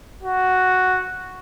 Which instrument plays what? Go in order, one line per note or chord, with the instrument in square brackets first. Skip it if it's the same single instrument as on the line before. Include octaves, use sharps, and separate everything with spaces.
[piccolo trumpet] F#4